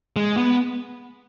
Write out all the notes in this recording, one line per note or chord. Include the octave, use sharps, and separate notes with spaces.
G#3
B3